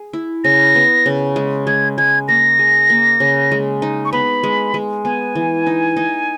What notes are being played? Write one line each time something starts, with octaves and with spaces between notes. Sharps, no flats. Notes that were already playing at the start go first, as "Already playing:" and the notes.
Already playing: G#4
E4
C#3 A#6
B3
C#3
G#3
G#3 G#6
G#3 G#6
A#3 A#6
G#4
A#3
C#3
G#3
D#4
C#6
B3 B5
G#3
G#3
B3 G#5
E3
D#4
D#4